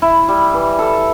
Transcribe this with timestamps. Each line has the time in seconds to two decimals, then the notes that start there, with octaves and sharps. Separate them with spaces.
0.02 E4
0.28 G3
0.53 E3
0.79 A4